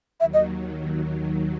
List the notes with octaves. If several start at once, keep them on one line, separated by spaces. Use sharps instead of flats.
D#2 D#3 F#3 E5
D#5